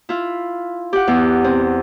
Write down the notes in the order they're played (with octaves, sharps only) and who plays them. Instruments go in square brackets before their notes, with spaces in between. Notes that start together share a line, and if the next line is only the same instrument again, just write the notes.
[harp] E4 F4
G4 F#5
E2
C4